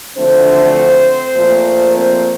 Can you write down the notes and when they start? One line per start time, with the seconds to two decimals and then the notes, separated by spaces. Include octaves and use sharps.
0.16 D2 D3 F3 A3 C4 D4 C5
1.35 A#2 F3 A3
1.95 C4 C5